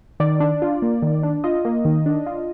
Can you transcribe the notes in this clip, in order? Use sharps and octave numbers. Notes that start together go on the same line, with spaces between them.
D#3 D5
D4
F4
A#3
D#3
D4
F4 D#5
A#3
D#3
D4
F4